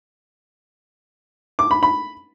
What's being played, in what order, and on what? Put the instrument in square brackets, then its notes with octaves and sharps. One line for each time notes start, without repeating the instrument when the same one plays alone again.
[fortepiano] D6
B5
B5